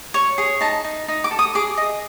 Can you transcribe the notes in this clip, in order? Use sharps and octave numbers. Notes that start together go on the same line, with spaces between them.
C#5
G#4
D#4 A5
D#4
D#4
D6
A4
D#6
G#4 D6
D#5